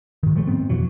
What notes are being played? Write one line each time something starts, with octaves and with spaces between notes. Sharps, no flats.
G#2 D#3
D#3 F3 G#3 A3
G#2 B3 C4
F2 B2 E3 F#3